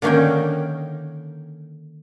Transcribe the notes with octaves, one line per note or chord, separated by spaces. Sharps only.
D3 D#3 A#3 C#4 D#4 G5